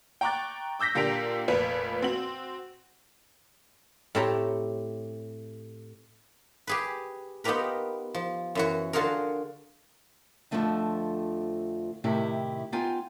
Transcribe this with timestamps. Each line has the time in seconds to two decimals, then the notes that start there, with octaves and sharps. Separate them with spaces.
0.21 G5 A#5 C#6 D6 F#6 A6
0.79 D6 E6 G6 A#6 B6
0.95 A#2 D3 G4 A#4 D7 F7
1.48 F1 A#2 B4
2.02 C4 F#4 F#7
4.15 A2 C4 E4 G4 C#5 A#5
6.67 G4 G#4 B4
7.44 B3 D#4 F4 G4 A#4 B4
8.14 F3
8.55 F#2 E3 F#4
8.93 D3 F4 F#4 G#4 A#4
10.51 F2 A2 D3 F3 A3 C4
12.04 A2 C3 D#3 E4 G4
12.72 B3 D#4 F4 G5 G#5